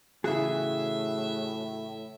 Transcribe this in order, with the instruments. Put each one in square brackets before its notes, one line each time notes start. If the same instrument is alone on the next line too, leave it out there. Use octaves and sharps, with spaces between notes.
[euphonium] A2 [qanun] C#3 E3 [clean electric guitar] F#4 G#4 [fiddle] E5